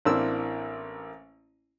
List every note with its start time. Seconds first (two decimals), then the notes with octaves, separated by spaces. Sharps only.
0.05 A1 A#3 C4 D4 E4 E6